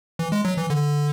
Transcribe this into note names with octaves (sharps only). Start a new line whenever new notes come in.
E3
G#3
F#3
E3
D3